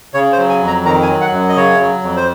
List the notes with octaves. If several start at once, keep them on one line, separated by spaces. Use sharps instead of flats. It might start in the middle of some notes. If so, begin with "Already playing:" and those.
C#3 C#5
C5
F#3
G#5
F2
A#5
D#3 A#5
G#5
F#3
F#5
F#2
D#5
C#3 C#5
F#3
F2
C5